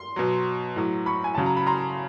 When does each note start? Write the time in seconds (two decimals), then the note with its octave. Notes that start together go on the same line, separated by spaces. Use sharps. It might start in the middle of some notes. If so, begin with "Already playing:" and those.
Already playing: C6
0.16 B2 F#3
0.76 A2 F#3
1.06 B5 C#6
1.24 G#5
1.35 C#3 F#3 A5
1.46 A#5
1.57 B5
1.67 A#5 C6